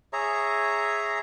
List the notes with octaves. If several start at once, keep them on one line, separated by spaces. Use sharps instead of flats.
G#4 C#5 E5 A#5